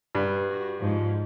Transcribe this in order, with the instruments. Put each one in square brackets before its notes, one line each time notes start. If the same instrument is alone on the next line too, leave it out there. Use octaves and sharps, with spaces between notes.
[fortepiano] G2
[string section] F#4
G#2 F3